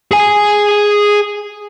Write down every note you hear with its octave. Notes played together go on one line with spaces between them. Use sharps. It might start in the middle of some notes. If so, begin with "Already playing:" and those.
G#4 G#5